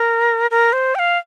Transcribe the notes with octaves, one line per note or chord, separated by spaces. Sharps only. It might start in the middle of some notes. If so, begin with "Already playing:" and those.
Already playing: A#4
A#4
C5
G5
F5